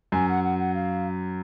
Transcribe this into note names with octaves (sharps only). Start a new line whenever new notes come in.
F#2 G#5
F#5
F#5
F#5
F5